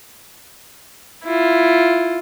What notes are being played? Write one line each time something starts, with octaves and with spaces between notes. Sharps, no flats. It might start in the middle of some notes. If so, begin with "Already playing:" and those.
E4 F4